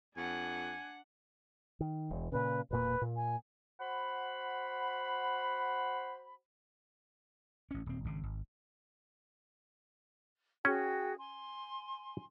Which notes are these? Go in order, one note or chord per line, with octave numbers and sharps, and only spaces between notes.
F2 D4 F#5 G#5
D#3
E1 E2
A#2 C#3 B4
E1 A#2 A#3 B4
A#2
G#5
F#4 C5 F#5 B5
A1 C#4
D#1 C4
G#1 C#3
G#1
C#4 F#4 G#4 G5
G#5 C6